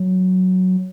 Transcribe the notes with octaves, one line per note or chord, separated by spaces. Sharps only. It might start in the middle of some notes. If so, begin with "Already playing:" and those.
Already playing: F#3